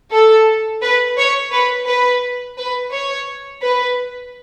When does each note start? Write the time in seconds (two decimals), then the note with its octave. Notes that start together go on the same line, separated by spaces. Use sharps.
0.12 A4
0.82 B4
1.17 C#5
1.52 B4
1.87 B4
2.57 B4
2.92 C#5
3.62 B4